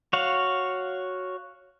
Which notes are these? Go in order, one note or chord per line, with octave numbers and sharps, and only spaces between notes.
F#4 C#5 F5